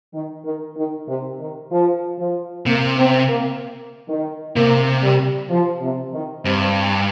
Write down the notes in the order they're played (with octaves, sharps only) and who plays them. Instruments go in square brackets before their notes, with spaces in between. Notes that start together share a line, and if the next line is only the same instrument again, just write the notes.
[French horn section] D#3
D#3
D#3
C3
D#3
F3
F3
[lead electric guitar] C3 [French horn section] A#3
[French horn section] C4
A#3
D#3
[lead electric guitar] C3 [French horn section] A#3
[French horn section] G3
F3
C3
D#3
[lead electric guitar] G2 [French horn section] C3